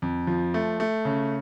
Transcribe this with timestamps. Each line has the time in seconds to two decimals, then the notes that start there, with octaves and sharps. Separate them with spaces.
0.02 F2
0.27 F3
0.54 A3
0.80 A3
1.05 C#3